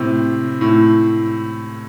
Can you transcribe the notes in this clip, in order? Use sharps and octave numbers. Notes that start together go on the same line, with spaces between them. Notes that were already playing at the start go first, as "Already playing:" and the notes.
Already playing: A2 C3
A2